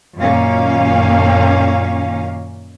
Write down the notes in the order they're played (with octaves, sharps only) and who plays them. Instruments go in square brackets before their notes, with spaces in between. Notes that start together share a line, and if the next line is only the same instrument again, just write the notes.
[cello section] F#2 A#2 D#3 A#3 C#4 F5